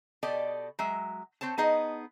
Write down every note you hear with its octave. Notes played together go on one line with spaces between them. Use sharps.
B2 G4 A4 D5 D#5
F#3 G#3 E5
C4 C5 C#5 A5
B3 D#4 G#4 D#5